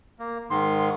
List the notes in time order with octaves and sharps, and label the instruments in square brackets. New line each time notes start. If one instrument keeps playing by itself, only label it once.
[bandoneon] A#3
[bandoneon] G#2 D#3 [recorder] C6